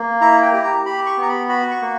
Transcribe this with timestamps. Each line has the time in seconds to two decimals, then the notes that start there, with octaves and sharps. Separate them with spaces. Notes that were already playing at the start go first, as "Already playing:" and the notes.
Already playing: A#3
0.21 E4 A#5
0.42 G5
0.53 G4
0.64 A#5
0.85 G4 B5
1.06 C#6
1.17 B3
1.22 A#5
1.28 B5
1.49 F#4 B5
1.71 C#6
1.82 A#3